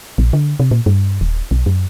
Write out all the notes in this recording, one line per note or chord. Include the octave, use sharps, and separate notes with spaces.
A#1
D3
C3
A#2
G2
D#1
B1
F#2